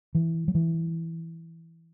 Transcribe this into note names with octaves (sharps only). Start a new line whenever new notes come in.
E3
F#3
E3